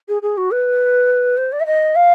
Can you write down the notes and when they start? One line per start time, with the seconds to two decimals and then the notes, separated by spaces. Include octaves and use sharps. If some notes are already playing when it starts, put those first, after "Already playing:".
0.08 G#4
0.22 G#4
0.37 F#4
0.51 B4
1.37 C5
1.52 D5
1.60 E5
1.66 D#5
1.95 F5